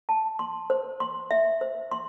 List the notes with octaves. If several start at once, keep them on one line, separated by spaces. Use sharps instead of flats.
A5
C6
C5
C6
E5
C5
C6